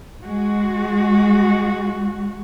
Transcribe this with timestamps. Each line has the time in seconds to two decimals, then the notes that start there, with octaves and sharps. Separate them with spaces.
0.24 G#3 F#4